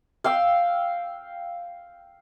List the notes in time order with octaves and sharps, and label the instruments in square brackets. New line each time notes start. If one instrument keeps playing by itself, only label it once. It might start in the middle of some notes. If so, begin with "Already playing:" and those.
[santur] F5 G5 E6